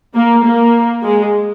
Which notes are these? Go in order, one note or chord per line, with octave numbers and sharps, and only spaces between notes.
A#3
A#3
G#3